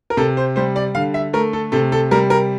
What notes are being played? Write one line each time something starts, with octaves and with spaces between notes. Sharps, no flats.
A#4
C3 A4
C5
G3 C5
D5
D3 F5
E5
A3 A#4
A4
C3 A4
A4
G3 A#4
A#4